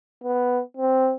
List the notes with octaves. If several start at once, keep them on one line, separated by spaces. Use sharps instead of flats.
B3
C4